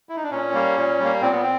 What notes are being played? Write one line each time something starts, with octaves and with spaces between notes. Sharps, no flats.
E4
D#4
D4
A#2 C#4
G3 A#3
A#2
G3 A#3
A#2 C4
B3
C4